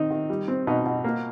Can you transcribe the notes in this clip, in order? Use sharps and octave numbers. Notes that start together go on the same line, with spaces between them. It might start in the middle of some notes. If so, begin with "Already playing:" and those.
Already playing: D#3 C4 D#4
D#3
G3
C4
B2 D#4
B2
A#3